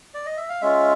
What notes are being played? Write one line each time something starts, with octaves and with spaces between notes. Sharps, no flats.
D5
D#5
E5
F5
G#3 C#4 F4 E5